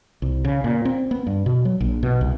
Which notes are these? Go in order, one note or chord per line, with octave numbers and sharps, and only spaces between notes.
C2
C#3
A#2
C4
B3
G2
B2
F#3
A#1
B2
C2